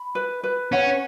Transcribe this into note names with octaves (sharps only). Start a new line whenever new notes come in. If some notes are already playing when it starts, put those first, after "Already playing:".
Already playing: B5
B4
B4
C#4 F#5